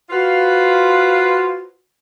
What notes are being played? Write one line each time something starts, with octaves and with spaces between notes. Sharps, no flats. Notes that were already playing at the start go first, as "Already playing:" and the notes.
F4 F#4 B4 C5 F5